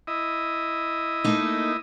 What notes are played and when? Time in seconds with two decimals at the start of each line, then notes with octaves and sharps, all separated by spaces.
0.07 E4 D#5
1.24 A3 A#3 D#4